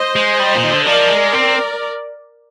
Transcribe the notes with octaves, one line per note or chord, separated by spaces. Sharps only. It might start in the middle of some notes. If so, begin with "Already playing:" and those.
Already playing: C5 D#5
G#3
G3
A#2
D#3
D3
F3 A#4 D5
G#3
C4